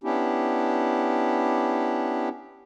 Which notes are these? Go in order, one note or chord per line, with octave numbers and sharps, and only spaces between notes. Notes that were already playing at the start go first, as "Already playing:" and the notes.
B3 C#4 D4 E4 G4